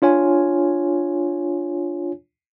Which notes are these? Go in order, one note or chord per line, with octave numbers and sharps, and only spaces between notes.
D4 F4 C#5 G#5